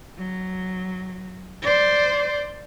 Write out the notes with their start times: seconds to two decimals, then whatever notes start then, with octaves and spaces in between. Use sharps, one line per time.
0.18 F#3
1.62 C5 D5